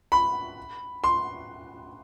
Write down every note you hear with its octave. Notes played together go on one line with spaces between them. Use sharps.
B5
C6